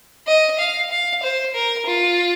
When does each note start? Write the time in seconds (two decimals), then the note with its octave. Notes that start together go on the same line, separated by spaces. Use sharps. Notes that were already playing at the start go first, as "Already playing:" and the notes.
0.27 D#5
0.59 F5
0.91 F5
1.22 C5
1.54 A#4
1.86 F4